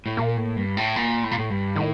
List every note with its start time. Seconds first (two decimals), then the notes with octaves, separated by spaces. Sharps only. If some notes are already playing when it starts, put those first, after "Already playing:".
0.06 A2
0.17 A#2 A#3
0.37 A2
0.57 G2
0.77 A2
0.96 A#2
1.24 A2
1.31 A#2
1.38 A2
1.50 G2
1.76 A2 D#3